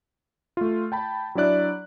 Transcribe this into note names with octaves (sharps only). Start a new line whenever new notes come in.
A3 F4
G5 A5 B5
F#3 D4 E4 D5 F#6